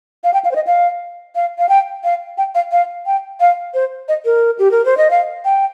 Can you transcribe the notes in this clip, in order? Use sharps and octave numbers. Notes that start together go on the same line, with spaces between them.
F5
G5
F5
C5
D#5
F5
F5
F5
G5
F5
G5
F5
F5
G5
F5
C5
D#5
A#4
G4
A#4
C5
D#5
F5
G5